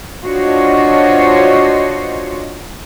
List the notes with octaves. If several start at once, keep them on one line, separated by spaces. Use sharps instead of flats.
D4 F4 F#4 C5 C#5 D#5